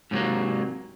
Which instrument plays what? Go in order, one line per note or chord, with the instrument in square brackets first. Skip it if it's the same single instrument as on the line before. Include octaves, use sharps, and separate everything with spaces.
[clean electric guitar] G#2 C3 F3 F#3 A#3